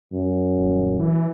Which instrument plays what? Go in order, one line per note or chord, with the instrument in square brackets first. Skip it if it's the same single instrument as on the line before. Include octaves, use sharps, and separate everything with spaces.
[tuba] F#2
[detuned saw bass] D#1
E3